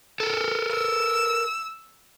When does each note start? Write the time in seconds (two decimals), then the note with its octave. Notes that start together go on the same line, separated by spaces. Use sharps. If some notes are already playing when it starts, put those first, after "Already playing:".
0.20 A4 A#4
0.71 E6